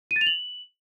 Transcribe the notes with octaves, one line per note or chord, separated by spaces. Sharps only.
D#7
A6
F7
F#7